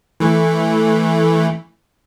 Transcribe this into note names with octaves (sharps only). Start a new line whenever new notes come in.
E3 A3